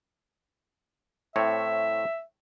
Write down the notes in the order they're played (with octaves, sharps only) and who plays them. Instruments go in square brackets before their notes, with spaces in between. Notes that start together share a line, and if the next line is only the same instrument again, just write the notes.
[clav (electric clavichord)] A2 C4 C#5 [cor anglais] E5